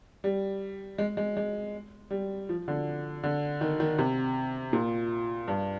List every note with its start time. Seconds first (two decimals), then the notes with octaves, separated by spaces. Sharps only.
0.24 G3
0.98 G#3
1.17 G#3
1.37 G#3
2.11 G3
2.49 F3
2.68 D3
3.23 D3
3.61 D#3
3.80 D#3
3.98 C3
4.73 A#2
5.48 G2